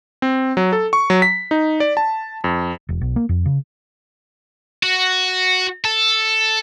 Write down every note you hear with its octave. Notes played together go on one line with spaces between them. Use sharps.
C4
F#3
A4
C#6
F#3
B6
D#4
D5
A5
F2
E1
B1
A#3
F2
C#3
F#4
A4